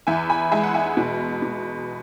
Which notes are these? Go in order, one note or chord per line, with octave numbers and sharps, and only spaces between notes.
E2 E5 G#5
G#5 B5
G#3 E5 G#5
F#5
E5 G#5
B2
B2